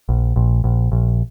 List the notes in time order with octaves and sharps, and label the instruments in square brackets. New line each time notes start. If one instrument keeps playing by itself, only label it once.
[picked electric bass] A#1
A#1
A#1
A#1